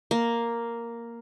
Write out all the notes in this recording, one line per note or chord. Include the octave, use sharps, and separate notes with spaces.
A#3